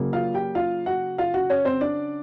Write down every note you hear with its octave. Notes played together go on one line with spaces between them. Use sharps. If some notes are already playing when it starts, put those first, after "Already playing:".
Already playing: C#3 F#3 A#3
F4 F5
G4 G5
F4 F5
F#4 F#5
F4 F5
F#4 F#5
C#4 C#5
C4 C5
D4 D5